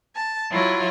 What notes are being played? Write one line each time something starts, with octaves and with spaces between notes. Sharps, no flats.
A5
F#3 E4 F4